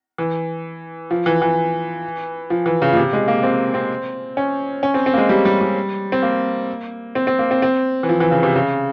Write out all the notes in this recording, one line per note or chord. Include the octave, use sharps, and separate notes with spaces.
E3
F3
E3
E3
F3
E3
C#3
A#2
C3
G#3
A#3
C4
C4
C#4
C#4
C4
C4
A#3
G#3
G3
G3
G3
C4
A#3
C4
C4
A#3
C4
C4
E3
F3
E3
C#3
C3
C#3